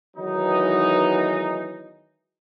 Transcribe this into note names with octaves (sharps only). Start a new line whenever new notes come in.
D#3 E3 F#3 G#3 B3 D#4